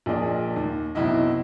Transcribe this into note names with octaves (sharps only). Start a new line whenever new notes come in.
A#1 A#2 D4 G#4 D#5
D#2
F#1 B1 C3 E4 D#5